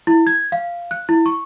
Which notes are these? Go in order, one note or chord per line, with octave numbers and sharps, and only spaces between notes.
E4
G#6
F5
F#6
E4
C#6